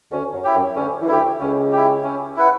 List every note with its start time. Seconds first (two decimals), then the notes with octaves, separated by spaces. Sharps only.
0.12 D2 D3 C#4
0.34 F#2 F#3
0.44 E4 G4
0.54 F#2 F#3
0.76 D2 D3 C#4
1.02 E3
1.08 D2 D3 E4 G4
1.40 C#2 C#3 C#4
1.72 E4 G4
2.04 C#4
2.36 E4 B4 F#5